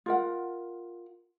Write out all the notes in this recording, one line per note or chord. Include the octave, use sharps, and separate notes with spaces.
F4 A#4 F#5